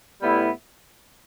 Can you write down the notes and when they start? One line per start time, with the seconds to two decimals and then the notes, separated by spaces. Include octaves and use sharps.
0.21 A2 G3 B3 E4